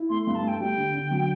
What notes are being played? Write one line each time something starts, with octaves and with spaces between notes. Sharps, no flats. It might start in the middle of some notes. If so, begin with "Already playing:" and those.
Already playing: E4
A3 C6
G2 C6
A5
A3 G5
G3 G5
D3
D3
F#3